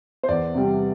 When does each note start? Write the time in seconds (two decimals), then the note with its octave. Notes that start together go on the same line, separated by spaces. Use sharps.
0.23 C5
0.28 E2 D5
0.54 C3 G3